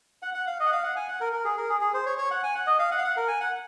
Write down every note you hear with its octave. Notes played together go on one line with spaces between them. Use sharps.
F#5
F#5
F5
D#5
F#5
F5
F#5
G#5
F#5
A#4
A#4
G#4
A#4
G#4
G#4
C5
C#5
C#5
F#5
G#5
F#5
D#5
F5
F#5
F5
F#5
A#4
G#5
F#5